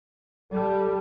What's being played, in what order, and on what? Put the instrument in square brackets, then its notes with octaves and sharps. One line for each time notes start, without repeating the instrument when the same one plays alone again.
[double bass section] G3 [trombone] A4